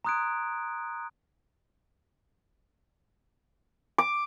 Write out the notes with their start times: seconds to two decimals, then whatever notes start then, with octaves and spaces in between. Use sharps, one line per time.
0.05 A#5 C6 D#6 F#6 G#6 D7
3.98 D6